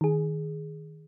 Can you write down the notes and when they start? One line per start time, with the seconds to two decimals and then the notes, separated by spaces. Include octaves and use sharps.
0.01 D#3 G#4